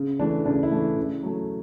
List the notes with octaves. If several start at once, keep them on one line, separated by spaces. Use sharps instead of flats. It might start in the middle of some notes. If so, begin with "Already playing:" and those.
Already playing: C#3
E3 A3 D4
C#3 D4
E4
E3 A3
C#3
F#3 A3